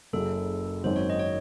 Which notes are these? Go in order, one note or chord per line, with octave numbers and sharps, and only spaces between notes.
F#1 F#2 C#3 A4
G#1 F#2 D#3 F#3 C5
C#5
D#5
C#5